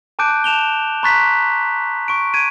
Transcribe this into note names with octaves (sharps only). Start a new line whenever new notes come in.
G#5 A5 D6 F#6 G6 D7
A5 E7 F7 G7
A#5 C6 C#6 F#6 A6 B6
C#6 D7
G#6 D7 D#7